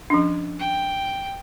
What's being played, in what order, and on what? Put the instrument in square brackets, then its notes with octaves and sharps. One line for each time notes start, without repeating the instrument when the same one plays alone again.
[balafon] F3 C#4 D4
[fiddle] G5